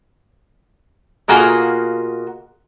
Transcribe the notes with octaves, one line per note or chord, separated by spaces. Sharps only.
B2 A#3 F4 F#4 G#4